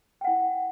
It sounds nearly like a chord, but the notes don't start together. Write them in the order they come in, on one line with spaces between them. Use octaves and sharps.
G5 F#5 E4